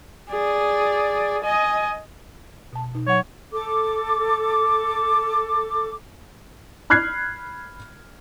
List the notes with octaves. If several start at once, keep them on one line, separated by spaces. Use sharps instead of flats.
G#4 D5
D#5 G#5
B2 A5
B2 D#4
F#3 C#5 F#5
A4 D6
B5 F6 F#6 G#6 C7